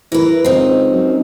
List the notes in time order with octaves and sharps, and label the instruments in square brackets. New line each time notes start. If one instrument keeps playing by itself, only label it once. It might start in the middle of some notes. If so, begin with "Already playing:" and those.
[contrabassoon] E3 [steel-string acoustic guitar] A#4 B4
[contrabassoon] C#2 [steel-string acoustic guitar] C4 D#4
[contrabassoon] F#2